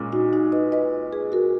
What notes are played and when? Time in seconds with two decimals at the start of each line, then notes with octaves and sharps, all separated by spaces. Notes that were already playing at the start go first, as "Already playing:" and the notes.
Already playing: A#2 G#3 C#4
0.12 D#4 F#4
0.33 D#4 F#4
0.52 B4 D#5
0.72 B4 D#5
1.13 G#4 B4
1.32 F#4 A#4